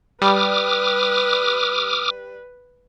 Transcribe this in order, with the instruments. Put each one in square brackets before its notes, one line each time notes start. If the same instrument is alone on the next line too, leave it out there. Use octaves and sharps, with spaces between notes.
[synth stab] G3 [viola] B4 [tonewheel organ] D6 D#6 F6